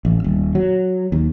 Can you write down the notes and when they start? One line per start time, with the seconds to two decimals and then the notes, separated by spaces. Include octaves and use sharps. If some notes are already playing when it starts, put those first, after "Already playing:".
0.05 A1
0.24 D#1
0.55 F#3
1.12 D#2